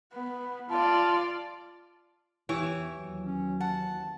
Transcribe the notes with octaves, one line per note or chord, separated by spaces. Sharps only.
B3
F4 D5 A5
E2 E3 E4 G4 C#5
D#2 F#3
C#4
F#5 A5